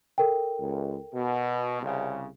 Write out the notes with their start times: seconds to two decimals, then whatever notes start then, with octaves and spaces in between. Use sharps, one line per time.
0.18 A4 A#4 G5
0.59 C#2
1.14 B2
1.81 C2 C#3